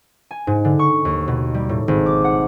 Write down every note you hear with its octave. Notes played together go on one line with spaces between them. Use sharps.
G#5
G#2
D3
C#6
D#2
B2
G3
A2
G#1
D6
F#5